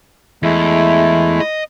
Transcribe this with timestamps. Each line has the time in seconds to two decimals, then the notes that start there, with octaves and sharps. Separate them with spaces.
0.43 E2 G#3 A3 E4
1.40 D#5